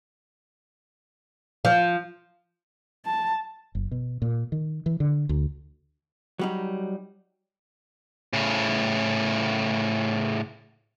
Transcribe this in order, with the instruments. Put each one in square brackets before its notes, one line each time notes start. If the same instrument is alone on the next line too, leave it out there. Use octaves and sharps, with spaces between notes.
[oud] F3
[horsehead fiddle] A5
[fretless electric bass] F#1
B2
A#2
D#3
E3
D3
D2
[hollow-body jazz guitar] F#3 G3 D#4
[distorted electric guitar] A2 C#3